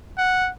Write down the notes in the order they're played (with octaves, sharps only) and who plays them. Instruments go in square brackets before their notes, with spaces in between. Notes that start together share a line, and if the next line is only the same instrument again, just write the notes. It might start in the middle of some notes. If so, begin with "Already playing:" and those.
[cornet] F#5